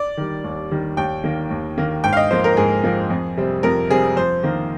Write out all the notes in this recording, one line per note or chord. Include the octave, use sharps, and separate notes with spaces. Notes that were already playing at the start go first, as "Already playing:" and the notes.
Already playing: D5
D#3 G3
D#2
D#3 G3
D#2 G5
D#3 A#3
D#2
D#3 A#3
G#2 G5
F5
D#5
F3 A#3 C5
A#4
G#2 G#4
F3 A#3
F2
C3 G3 C4
F2 A#4
C3 G3 C4 G#4
F2 C5
D#3 A#3